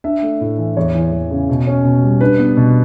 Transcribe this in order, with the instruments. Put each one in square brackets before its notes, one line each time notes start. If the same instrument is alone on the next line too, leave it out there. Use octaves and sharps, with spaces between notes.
[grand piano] D4 E5
A3
A2
E3
E2 C#5
E3
E2
C#3
B2
C#4
B2
G3
D4 B4
B3
B2